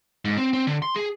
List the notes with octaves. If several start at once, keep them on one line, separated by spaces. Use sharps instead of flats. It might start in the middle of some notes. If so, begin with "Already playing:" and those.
G#2
C4
C4
D3
C6
G#4